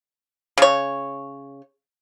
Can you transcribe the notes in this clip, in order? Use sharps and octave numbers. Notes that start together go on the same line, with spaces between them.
C#3 C#5